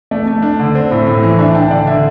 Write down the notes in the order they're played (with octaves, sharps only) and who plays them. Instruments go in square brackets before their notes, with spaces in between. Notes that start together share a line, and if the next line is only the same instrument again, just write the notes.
[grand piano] A3 D5
A3
D4
D3
C4
A2
A2
E3
D4 E5
D4 G5
D3 D5
D3 E5